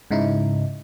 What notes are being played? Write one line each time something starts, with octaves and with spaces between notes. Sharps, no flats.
G#2 C#3 D#4 E4